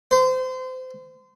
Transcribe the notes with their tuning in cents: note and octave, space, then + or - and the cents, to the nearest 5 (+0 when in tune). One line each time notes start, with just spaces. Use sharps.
C5 -30